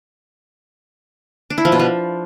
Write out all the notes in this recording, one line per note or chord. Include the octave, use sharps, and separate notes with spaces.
D4
E4
F3
B2
F3